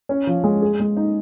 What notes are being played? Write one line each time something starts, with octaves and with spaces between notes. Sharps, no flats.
C#4
F3
G#3
G#4
G#3
D#4